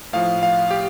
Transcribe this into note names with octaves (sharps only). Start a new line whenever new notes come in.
A2 F3 F5
F5
G4